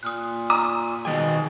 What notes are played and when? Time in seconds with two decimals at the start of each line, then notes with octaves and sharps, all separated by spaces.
0.03 A#2 D#6 F6 F#6
0.50 A#5 D#6 E6
1.05 B2 D#3 G#4 G5 G#5